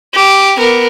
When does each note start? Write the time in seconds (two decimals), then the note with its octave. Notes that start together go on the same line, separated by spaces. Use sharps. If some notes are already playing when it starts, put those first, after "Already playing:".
0.15 G4
0.57 B3 A#4